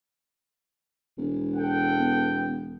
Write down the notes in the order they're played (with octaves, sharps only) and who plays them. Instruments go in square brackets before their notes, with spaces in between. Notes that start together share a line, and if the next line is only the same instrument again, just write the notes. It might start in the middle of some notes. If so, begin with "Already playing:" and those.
[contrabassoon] E1
[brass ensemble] A4 F#5 G5
[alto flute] B3